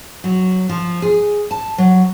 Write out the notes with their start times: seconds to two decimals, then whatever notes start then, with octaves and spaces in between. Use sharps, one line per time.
0.24 F#3
0.69 F3
1.02 G#4
1.51 A5
1.78 F#3